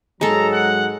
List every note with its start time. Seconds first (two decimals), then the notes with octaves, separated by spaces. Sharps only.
0.21 G#2 F#3 G#3 A4 A#5
0.53 F#5